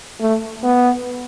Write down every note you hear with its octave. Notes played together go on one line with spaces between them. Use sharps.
A3
B3